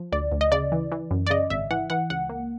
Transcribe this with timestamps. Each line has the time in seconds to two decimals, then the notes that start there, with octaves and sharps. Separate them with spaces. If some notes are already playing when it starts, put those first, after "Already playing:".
Already playing: F3
0.12 D2 D5
0.32 D2
0.41 D#5
0.52 C#3 D5
0.72 E3
0.92 E3
1.11 F#2
1.27 D5
1.30 C#3 D#5
1.50 G#1 E5
1.71 E3 F#5
1.90 E3 F#5
2.10 C#2 F#5
2.29 A#3